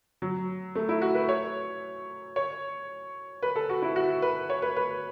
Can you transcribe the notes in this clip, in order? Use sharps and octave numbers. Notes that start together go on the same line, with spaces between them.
F#3
A3
E4
F#4
B4
C#5
C#5
B4
A4
F#4
E4
F#4
B4
C#5
B4
B4